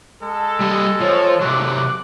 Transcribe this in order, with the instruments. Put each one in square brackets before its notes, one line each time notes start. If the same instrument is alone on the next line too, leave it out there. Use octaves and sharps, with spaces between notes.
[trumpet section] G#3 A4
[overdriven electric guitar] G3 D#5
[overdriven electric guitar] F3 [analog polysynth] C5 C#5
[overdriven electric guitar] C3 F#3 [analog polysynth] D6 F#6